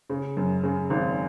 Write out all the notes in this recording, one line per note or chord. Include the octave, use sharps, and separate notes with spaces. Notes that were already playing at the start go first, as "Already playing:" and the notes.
C#3
F#2
C#3
G#1